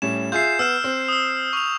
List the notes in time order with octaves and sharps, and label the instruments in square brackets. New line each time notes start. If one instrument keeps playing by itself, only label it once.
[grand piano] A2 G3 C#4 [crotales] E7
[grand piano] F4 G#4 E5 [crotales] G6 C7
[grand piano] B3 [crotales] E6 F6 E7
[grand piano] C4
[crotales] D#6 E6
C#6 F7